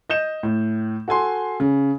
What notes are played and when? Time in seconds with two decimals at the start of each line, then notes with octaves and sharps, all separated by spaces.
0.10 D#5 G6 E7
0.43 A2
1.08 F#4 A4 G#5 C6
1.60 C#3